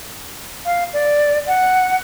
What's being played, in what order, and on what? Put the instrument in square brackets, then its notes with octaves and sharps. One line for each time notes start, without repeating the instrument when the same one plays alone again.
[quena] F5
D5
F#5